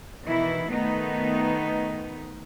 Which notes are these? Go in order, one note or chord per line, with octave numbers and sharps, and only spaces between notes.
B2 D#3 E3 E4
D#3 A3 B3 D#4